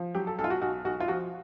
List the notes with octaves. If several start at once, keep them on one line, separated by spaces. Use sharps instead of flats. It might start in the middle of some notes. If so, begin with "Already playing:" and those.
Already playing: F3
F#3 G4
A4
B1 A4
F4
F#4
B1 F#4
B1 F#4
F4
F3 F#4